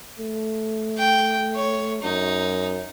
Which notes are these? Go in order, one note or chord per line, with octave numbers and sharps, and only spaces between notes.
A3
G5
C#5
F#2 D#4